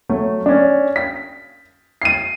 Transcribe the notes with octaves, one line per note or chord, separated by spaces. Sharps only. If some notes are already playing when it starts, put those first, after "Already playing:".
F#3 A3
C#4 D4
B6
C7 D#7